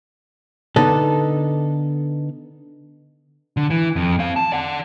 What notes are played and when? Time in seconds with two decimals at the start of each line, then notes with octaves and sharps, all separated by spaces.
0.76 D3 B3 D#4 A4
3.57 D3
3.70 E3
3.96 F2
4.19 C4 F5
4.36 A5
4.52 D5 F#5